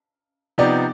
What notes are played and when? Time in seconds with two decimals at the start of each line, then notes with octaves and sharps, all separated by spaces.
0.58 C3 F3 B3 D#4 G4 D5